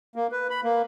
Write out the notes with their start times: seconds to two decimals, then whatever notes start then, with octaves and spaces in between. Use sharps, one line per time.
0.16 A#3
0.32 B4
0.50 B5
0.64 A#3